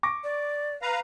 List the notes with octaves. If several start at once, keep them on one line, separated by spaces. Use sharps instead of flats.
C#6 D6 A#6
D5
B4 F5 A#5